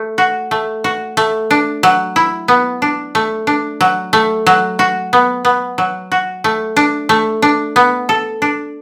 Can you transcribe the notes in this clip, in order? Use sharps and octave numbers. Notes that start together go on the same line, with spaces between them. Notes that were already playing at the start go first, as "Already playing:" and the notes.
Already playing: A3
F#4
A3
F#4
A3
D4
F#3
E4
B3
D4
A3
D4
F#3
A3
F#3
F#4
B3
B3
F#3
F#4
A3
D4
A3
D4
B3
A4
D4